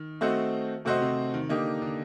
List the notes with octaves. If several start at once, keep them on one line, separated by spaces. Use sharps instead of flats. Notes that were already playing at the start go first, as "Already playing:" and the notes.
Already playing: D#3
A3 C4 F#4 C5 D#5
C3 A3 C4 F#4 C5 D#5
C3
D#3
D3 A#3 D#4 G4
D3